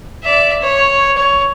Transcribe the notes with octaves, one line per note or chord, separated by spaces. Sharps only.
D5 E5
C#5
C#5